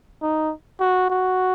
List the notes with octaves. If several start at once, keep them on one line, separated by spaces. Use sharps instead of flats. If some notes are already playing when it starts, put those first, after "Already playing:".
D#4
F#4
F#4